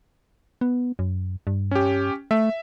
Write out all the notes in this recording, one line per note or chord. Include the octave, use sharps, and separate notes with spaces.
B3
F#2
G2
C#4 G4
A3 E5